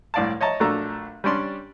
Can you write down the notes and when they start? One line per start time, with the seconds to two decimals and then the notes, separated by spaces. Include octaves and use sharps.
0.14 C2 A2 D5 F5 A5
0.41 C#5 D#5 E5 A5 A#5
0.60 A#1 F#3 A3 D4 A4 A#5
1.24 G3 C#4 D4 D5 C6